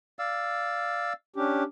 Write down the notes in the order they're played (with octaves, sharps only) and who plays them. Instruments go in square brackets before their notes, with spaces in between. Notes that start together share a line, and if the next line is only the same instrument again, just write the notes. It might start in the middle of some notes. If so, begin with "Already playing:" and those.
[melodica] D5 F5 E6
[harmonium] C#4 D4 G4